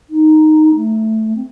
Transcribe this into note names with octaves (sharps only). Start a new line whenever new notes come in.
D#4
A3
C4